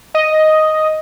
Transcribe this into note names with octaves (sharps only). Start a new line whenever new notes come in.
D#5